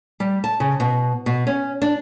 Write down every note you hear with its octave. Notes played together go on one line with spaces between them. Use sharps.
G3
A5
C#3
B2
B2
C#4
D4